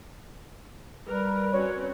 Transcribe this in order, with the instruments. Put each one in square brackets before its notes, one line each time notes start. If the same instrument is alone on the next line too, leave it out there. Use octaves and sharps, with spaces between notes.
[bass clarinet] G3 [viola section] A#4 [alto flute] B4
[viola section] C4 C#4 F#4 [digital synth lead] C#5